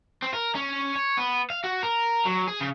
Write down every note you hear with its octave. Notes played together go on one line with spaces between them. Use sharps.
C4
A#4
C#4
C#5
B3
F5
F#4
A#4
F#3
G#4
C#3